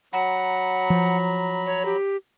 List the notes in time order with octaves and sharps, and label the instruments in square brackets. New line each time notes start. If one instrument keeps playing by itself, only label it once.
[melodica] F#3 A#5 B5 [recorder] F#5
[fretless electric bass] F3
[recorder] C#5
G4